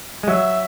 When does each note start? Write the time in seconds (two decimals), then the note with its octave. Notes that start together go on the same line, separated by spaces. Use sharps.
0.23 G#3
0.28 F#3 E5